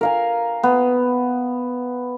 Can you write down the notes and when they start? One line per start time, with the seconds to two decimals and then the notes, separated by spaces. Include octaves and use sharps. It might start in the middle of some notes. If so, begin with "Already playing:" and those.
0.01 A#4 F5 G#5
0.63 B3